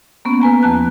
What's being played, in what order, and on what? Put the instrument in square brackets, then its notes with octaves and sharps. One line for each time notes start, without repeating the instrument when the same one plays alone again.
[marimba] A#3 B3 C#4
B4 G#5 A#5
E2 F3 A5 F#6